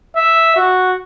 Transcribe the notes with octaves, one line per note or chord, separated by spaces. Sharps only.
E5
F#4